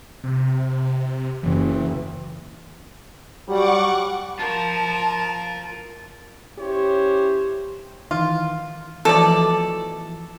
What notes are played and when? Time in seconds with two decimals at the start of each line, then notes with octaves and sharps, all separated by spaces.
0.24 C3
1.43 F#1 E3
3.49 F#3 G3 F#5 C#6 D6
4.39 F4 A#4 C5 A5
6.59 C#4 E4 G4 C5 C#5
8.11 D#3 E3 F4
9.05 B2 E3 F3 A3 A4 D5